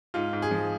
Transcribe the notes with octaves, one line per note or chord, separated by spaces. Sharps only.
G#2 F4
G#2
G#4
F3